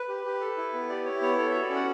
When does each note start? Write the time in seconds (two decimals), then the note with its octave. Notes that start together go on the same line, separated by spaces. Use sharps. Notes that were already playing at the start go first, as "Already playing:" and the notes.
Already playing: B4
0.08 G4
0.25 G4
0.41 A4
0.57 E4
0.73 B3
0.89 G4 D5
1.05 E4 C#5
1.22 B3 C#5
1.38 A4 C#5
1.51 F#4 E5
1.62 D5
1.70 C#4
1.75 F#5